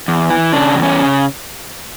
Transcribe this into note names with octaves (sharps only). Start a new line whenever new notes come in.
E2
E3
C#3 D4
E2
C#4
C#3